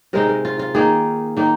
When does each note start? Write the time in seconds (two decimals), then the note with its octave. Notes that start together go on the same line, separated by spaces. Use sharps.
0.13 C3 G#3 D#4 A#4
0.29 A#4
0.45 F4
0.59 F4
0.75 D#3 A#3 D#4 G#4
1.37 D#3 A#3 D#4